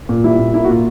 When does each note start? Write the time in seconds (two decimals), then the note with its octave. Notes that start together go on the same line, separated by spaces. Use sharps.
0.09 A#2
0.24 G3 E4
0.39 A#2
0.54 A#3 E4
0.64 F#4
0.70 A#2 F4